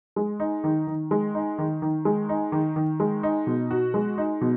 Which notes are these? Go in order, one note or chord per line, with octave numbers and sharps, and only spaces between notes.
G#3
D#4
D#3
D#3
G#3
D#4
D#3
D#3
G#3
D#4
D#3
D#3
G#3
D#4
B2
F#4
G#3
D#4
B2